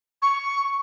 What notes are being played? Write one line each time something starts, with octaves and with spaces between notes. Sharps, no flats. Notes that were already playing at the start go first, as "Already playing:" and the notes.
C#6